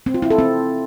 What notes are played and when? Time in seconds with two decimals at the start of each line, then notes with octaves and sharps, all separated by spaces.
0.06 C4
0.14 F4
0.22 E4
0.30 A4
0.38 C4